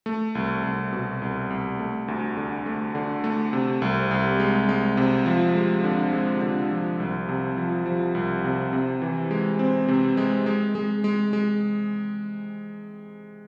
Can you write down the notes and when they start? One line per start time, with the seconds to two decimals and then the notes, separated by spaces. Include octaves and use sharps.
0.06 A3
0.35 C2
0.64 C2
0.93 B2
1.22 C2
1.50 C2
1.79 A3
2.08 D2
2.37 D3
2.66 A3
2.95 D3
3.24 A3
3.53 C3
3.82 C2
4.11 C2
4.40 G#3
4.69 G#3
4.97 C3
5.26 F3
5.55 G#3
5.84 D3
6.13 G#3
6.41 D3
6.71 F3
7.00 C2
7.29 C3
7.57 F3
7.86 F3
8.15 C2
8.44 C3
8.73 C3
9.02 E3
9.31 G#3
9.59 C4
9.88 C3
10.17 G#3
10.46 G#3
10.75 G#3
11.04 G#3
11.33 G#3